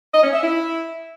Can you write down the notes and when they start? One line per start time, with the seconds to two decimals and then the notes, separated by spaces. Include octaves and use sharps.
0.13 D#5
0.23 C#4
0.33 E5
0.43 E4